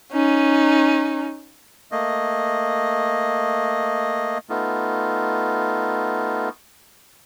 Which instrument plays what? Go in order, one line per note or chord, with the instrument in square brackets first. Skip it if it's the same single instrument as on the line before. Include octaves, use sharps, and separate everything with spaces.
[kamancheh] C#4 D#4
[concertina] A3 A#3 D#5
A3 B3 D#4 F4